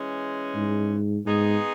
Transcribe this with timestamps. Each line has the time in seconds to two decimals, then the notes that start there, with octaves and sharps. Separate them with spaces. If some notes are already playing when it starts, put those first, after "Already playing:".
Already playing: E3 G#3 C#4
0.55 G#2
1.26 G#2 G#3 B3 D#4 G#4